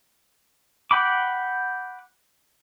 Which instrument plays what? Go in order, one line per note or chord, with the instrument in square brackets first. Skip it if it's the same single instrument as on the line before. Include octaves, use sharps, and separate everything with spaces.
[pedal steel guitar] F#5 G5 B5 D6